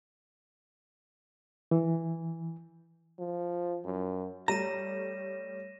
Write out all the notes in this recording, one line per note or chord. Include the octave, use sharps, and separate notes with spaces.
E3
F3
F#2
G3 A3 C#5 A#5 A#6 D#7 E7